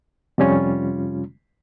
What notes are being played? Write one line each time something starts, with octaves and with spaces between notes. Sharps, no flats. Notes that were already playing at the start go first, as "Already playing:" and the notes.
F2 C3 G3 C#4 F4